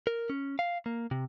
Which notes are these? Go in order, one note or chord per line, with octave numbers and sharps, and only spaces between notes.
A#4
C#4
F5
A#3
C3